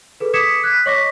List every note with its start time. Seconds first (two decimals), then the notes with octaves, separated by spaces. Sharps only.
0.20 G#4 A4 B4
0.33 D6 D#6 G#6 B6 C#7 E7
0.64 F#6 G#6 B6
0.86 C#5 D#5 C#6 D6 A#6 B6